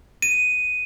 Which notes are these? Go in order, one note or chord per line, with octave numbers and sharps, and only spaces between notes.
D#7